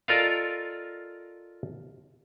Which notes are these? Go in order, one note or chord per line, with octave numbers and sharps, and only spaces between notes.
F4 A4 A#4 D5 D#5 F5